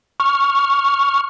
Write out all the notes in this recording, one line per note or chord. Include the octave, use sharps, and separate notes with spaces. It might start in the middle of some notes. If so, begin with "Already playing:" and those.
C#6 F6